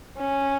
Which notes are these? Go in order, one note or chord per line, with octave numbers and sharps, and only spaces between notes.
C#4